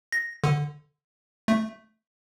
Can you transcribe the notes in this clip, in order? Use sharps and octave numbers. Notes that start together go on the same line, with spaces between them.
A#6
D3
A3